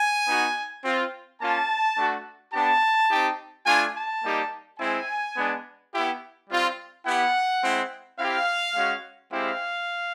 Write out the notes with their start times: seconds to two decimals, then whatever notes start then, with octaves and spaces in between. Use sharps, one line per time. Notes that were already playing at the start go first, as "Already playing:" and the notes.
Already playing: G#5
0.27 B3 D#4 F#4
0.83 C4 F4
1.40 A#3 C#4 F4 A5
1.96 A3 D4 F#4
2.52 B3 D4 G4 A5
3.09 C4 D#4 G4
3.66 A3 D4 F4 G#5
3.94 A5
4.22 G3 A#3 D#4 G4
4.79 G#3 C4 E4 G#5
5.36 G#3 B3 D4
5.92 B3 E4 G4
6.49 G3 C4 F4
7.05 B3 E4 G4 F#5
7.61 G#3 C4 E4
8.18 C4 E4 G4 F5
8.74 G#3 C#4 F#4
9.31 G#3 C4 E4 G4 F5